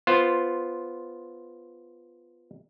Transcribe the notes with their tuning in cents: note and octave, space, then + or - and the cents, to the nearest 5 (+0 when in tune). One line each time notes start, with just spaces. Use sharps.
B3 +0 F4 +0 C5 +10